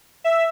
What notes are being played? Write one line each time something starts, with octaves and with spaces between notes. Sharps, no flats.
E5